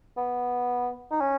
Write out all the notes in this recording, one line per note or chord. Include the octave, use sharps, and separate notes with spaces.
B3
D#4
C#4